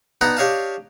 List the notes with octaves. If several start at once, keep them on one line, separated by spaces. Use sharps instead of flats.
B3 D4 D#4 F#5 A#5
D4 G4 C#5 D#5 F5 A5